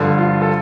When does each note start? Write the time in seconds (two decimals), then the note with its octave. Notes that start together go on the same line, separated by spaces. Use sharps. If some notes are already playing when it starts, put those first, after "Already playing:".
Already playing: G2 D3 F3
0.18 F4
0.42 A4